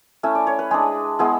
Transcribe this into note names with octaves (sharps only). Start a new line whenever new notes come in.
A3 C#4 E4 E5
D5
C#5
B4
G#3 D4 G#4
G#3 B3 E4